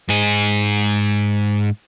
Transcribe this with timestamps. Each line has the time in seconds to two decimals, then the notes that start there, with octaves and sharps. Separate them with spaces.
0.09 G#2 G#4